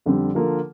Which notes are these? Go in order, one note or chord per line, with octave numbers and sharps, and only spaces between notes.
F2 D3 G3 C4
D3 F3 A#3 F4 A4